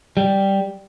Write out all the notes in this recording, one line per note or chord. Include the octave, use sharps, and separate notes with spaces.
G3